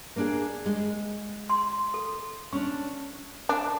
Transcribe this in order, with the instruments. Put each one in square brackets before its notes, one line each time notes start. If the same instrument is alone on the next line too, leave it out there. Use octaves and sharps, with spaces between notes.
[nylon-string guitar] A#3 D4 G#4
G#3
[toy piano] C6
A4
[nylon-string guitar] C#4 D4 [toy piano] C#6
[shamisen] D4